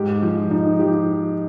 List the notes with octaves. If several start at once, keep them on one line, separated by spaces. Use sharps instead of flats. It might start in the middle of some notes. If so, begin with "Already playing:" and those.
Already playing: G#2 G4
F3
F3 D#4
F3 G4